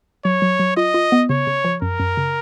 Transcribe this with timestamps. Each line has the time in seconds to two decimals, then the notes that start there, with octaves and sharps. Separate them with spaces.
0.25 F#3 C#5
0.42 F#3
0.59 F#3
0.77 F4 D#5
0.94 F4
1.12 B3
1.29 C#3 C#5
1.47 C#3
1.64 F3
1.82 F#2 A#4
2.00 F#2
2.17 C#3